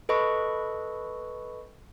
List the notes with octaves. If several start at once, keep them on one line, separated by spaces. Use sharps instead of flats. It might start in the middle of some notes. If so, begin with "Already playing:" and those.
A4 B4 D#5 B5 C#6